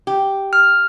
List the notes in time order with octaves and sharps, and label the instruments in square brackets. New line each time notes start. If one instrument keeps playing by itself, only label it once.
[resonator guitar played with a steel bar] G4
[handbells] F6